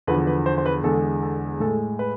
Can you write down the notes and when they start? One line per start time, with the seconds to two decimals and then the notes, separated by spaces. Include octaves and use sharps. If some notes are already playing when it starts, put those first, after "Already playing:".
0.07 E2 D3 F3 B4
0.27 B4
0.46 C5
0.58 C5
0.66 B4
0.84 E2 D3 G#3 A4
1.23 A4
1.60 A2 G#3 A4
1.99 B4